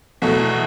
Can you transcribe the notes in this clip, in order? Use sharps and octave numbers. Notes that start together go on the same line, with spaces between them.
E2 B2 A3